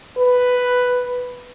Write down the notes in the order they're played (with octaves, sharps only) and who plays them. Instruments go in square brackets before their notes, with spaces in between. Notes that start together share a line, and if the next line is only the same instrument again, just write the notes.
[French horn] B4